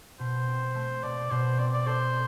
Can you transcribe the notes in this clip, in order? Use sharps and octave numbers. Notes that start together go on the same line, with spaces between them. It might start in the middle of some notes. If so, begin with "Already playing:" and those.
B2 C5
C4
A3
B2 D5
B2 C5
C4 D5
D5
A4 C5